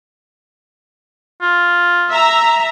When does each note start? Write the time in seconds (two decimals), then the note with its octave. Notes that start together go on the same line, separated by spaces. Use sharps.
1.42 F4
2.11 E5 A#5